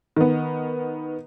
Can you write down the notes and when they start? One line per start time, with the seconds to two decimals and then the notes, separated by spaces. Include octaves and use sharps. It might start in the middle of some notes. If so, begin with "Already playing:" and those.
0.17 D#3 B3